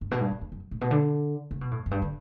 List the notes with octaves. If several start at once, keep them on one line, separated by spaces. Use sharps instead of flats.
G2
B2
G2
F#2
E2
F#2
A2
B2
D3
C#3
B2
A2
F#2
G2
D3